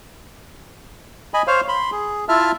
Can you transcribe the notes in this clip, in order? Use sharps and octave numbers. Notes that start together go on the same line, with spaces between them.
D#5 G#5 B5
C5 C#5 F5
B5 C6
G#4
E4 F4 E5 A5 F6